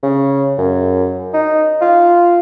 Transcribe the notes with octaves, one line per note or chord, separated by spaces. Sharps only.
C#3
F#2
D#4
F4